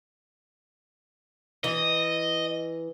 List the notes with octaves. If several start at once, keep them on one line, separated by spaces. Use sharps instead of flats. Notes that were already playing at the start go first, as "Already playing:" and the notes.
E3 D#5